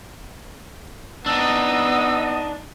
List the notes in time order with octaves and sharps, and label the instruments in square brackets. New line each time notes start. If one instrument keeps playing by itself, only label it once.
[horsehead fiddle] B3 D#5 [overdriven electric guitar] D4 D#4 [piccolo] E6